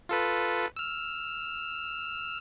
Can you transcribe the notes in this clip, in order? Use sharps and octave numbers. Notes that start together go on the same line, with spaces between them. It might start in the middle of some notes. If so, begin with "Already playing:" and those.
F4 A4 B4
E6 F6